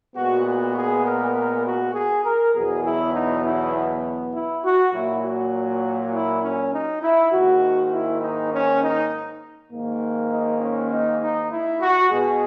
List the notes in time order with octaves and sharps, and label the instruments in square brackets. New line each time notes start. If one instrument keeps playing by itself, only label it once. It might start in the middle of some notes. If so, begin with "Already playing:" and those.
[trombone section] A#2 G#3 B3 F#4
F#4
G#4
A#4
A#4
F#4
G#4
A#4
E2 B2 F#3 B3 G#4
E4
D#4
E4
E4
F#4
A#2 F#3 A#3 E4
F#4
E4
C#4
D#4
E4
G#2 D#3 A#3 F#4
E4
D#4
C#4
D#4
G#2 D#3 A#3
D#4
C#4
D#4
D#4
E4
F#4
B2 G#3 B3 G#4